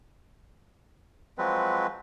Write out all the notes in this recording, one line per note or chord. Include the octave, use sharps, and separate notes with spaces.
F3 F#3 G#3 C4 B4